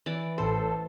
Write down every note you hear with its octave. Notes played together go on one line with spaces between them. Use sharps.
E3 D5
A1 A2 A4 C5